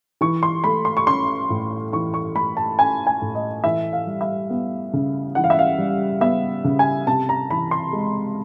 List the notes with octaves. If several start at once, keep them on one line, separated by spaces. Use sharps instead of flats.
E3 C#6
C6
A3 B5
C6
C#6
C#4 C6
A2
E3 C#6
C#6
A3 B5
A5
C#4 G#5
G#5
A2
D#5
E3 E5
F5
G3
E5
B3
C#3
E3 F#5
F5
E5
F5
G3
B3 E5
C#3
G#5
C3 A5
A#5
E3 B5
C6
G#3